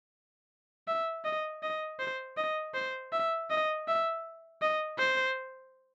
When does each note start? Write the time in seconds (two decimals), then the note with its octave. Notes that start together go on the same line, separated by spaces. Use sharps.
0.88 E5
1.25 D#5
1.63 D#5
2.00 C5
2.37 D#5
2.74 C5
3.13 E5
3.51 D#5
3.88 E5
4.62 D#5
4.99 C5